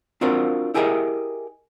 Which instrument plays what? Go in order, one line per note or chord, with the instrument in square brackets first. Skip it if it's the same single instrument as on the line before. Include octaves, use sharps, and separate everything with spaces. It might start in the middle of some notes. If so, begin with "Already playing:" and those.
[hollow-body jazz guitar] C4 D4 F4 F#4 A#4 C5
E4 G4 G#4 A#4 D#5 E5